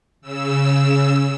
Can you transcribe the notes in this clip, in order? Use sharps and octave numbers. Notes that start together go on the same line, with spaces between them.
C#3 E6